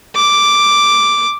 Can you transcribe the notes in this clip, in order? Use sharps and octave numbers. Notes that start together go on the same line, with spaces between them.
D6